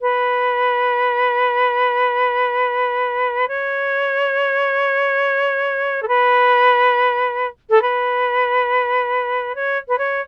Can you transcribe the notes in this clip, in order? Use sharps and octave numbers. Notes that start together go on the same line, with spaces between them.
B4
C#5
A4
B4
A4
B4
C#5
B4
C#5